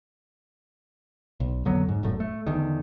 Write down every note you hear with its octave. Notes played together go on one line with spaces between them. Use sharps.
B1
F2 D3 F#3 B3
G#2
E1 F#2 A2
A3
E2 D3 D#3